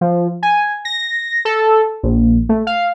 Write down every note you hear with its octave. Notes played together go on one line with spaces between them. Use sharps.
F3
G#5
A#6
A4
A#1
A3
F5